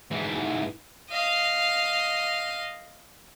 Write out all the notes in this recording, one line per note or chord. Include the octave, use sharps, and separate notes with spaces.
G#2 E3
D#5 F5